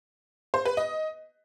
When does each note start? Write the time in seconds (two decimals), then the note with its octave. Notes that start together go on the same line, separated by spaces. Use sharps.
0.54 C5
0.65 B4
0.77 D#5